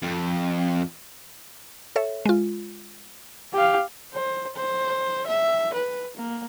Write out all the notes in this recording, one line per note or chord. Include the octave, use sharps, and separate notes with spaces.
F2
A4 C#5 E5
G#3 F4
G4 F5
C5
C5
E5
B4
A#3